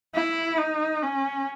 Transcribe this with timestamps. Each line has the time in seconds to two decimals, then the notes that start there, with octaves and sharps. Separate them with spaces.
0.14 E4
0.58 D#4
1.02 C#4